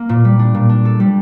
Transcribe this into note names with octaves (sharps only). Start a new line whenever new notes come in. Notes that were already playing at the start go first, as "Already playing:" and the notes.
Already playing: A#3
A#2
G3
D4
A#2
D4
A4
G3